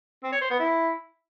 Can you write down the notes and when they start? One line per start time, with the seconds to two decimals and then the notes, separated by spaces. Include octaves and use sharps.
0.23 C4
0.32 C#5
0.42 C5
0.51 B3
0.60 E4